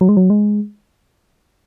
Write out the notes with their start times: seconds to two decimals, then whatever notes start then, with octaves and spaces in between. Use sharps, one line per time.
0.01 F#3
0.09 G#3
0.17 F#3
0.30 G#3